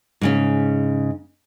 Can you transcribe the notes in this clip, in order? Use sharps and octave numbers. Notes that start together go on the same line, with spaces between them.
G#2 C#3 C#4